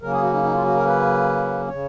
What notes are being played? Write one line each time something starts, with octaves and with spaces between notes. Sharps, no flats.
C#3 F#3 A#3 C#4 A#4
G#4
F#4
D#4
D#4
F4
F#4
A#4
B4
C#3 C#5